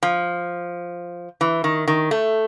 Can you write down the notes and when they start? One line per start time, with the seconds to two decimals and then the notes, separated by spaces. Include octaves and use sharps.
0.03 F3
1.41 E3
1.64 D#3
1.87 D#3
2.11 A3